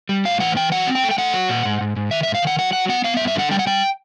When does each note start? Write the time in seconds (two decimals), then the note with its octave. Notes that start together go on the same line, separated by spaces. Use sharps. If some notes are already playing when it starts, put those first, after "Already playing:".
0.09 G3
0.25 A2 F5
0.40 E3 F#5
0.56 E3 G5
0.72 F#3 F#5
0.87 C4
0.95 G5
1.03 A3
1.11 G5
1.18 A3 F#5
1.34 F#3
1.49 A#2
1.65 G#2
1.81 G#2
1.96 G#2
2.11 D#3 E5
2.23 E5
2.28 G#2
2.35 F5
2.42 D#3 F#5
2.58 F#3 F#5
2.73 F#3 F#5
2.89 B3 F#5
3.04 B3 F5
3.17 E5
3.20 G2
3.28 E5
3.35 D3 F#5
3.51 G3 G5
3.59 F#5
3.67 G3 G5